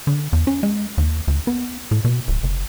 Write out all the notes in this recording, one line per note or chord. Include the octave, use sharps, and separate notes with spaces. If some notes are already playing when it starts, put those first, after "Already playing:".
D3
E2
C#4
G#3
D#2
D2
B3
A2
B2
D1
F#1